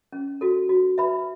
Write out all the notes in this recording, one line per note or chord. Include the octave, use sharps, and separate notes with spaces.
C#4
F#4 A4
F#4
B4 E5 B5